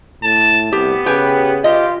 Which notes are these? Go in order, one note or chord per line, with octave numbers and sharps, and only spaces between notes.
A2 A5
C2 B3 G4
C#3 G4 B4 G5 G#5
F4 G4 D#5